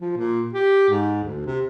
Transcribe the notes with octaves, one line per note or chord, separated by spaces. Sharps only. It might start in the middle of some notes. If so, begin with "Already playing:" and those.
F3
A#2
G4
G#2
D2
C3